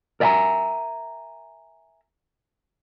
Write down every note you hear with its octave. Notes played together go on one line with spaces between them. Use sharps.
A#4 D5 E5 G5 G#5 A#5